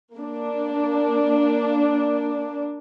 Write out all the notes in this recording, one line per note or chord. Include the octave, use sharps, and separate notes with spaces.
A#3 D4